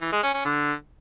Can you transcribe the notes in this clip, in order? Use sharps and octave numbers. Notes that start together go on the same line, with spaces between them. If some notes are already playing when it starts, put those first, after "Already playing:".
E3
G#3
C#4
C#4
D3